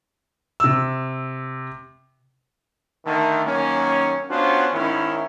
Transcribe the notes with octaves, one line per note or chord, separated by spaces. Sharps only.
C3 E6
D3 D#3 A3
F#2 D#3 A#3 C#4
B3 C#4 D4 F4 F#4 C5
G#2 D#3 C#4 E4